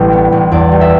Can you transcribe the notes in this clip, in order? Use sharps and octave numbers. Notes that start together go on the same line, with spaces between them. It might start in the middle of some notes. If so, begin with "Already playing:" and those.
Already playing: A1 G3
B3
A1
E2 D5
G3
E5